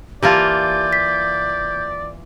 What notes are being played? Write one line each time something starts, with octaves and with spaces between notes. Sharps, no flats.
E3 A#3 F4 G4 D5 A5 G6
B6